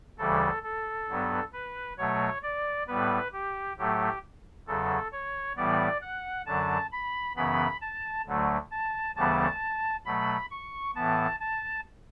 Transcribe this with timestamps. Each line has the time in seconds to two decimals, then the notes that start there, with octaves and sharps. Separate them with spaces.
0.18 D2 C#3 E3 G3 A4
0.64 A4
1.09 G2 F#3 B3
1.53 B4
1.98 B2 F#3 A3 C#5
2.43 D5
2.88 A2 G3 B3 B4
3.33 G4
3.78 A2 F#3 A3 G4
4.67 E2 C#3 F#3 A4
5.12 C#5
5.57 A2 E3 G3 B3 D5
6.01 F#5
6.46 F#2 D3 F#3 A5
6.92 B5
7.36 F#2 C#3 E3 B3 B5
7.81 A5
8.26 D2 D3 F#3 A3
8.71 A5
9.16 D2 C#3 E3 G3 B3 A5
10.05 B2 F#3 A3 B5
10.51 C#6
10.95 A2 E3 B3 A5
11.40 A5